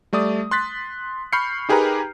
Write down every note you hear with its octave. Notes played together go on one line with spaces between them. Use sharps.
G3 A3 D5 D#6
C6 F#6 A6 B6
B5 C#6 F6 G6 C7 C#7
D#4 G4 G#4 A#4 B4 A#5